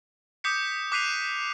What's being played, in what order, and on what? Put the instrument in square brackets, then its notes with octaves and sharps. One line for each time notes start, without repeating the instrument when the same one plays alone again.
[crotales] D6 D#6 G6 B6 C#7
D6 F#6 B6 C7 D#7 F7